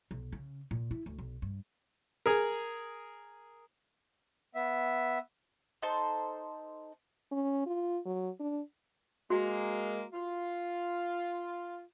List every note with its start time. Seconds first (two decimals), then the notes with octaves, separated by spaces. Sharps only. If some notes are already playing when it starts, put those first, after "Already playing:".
0.11 B1
0.32 C#3
0.71 A#2
0.91 E4
1.06 D2
1.19 B1
1.42 G2
2.26 G#4 A#4
4.55 B3 E5
5.82 D#4 A4 C5 A5
7.32 C#4
7.66 F4
8.06 F#3
8.40 D4
9.30 G#3 A#3 F#4
10.13 F4